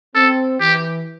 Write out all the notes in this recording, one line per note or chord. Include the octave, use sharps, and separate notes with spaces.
C4 A4
E3 G4